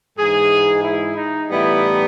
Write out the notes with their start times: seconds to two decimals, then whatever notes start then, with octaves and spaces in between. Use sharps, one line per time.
0.17 G#2 E3 G#3 G#4
0.83 E4
1.17 D#4
1.49 A2 E3 G3 B3 D#4 E4